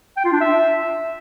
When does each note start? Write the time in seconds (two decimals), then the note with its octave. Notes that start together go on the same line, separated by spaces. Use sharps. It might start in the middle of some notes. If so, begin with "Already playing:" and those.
0.17 G5
0.25 F4
0.33 D4
0.41 E5